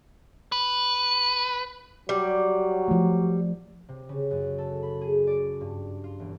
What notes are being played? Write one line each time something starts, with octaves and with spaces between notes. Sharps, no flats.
B4
F#3 G3
F3 A3
C3
C#3
F#2
A4
B5
G#4
D5
G2
F4
E1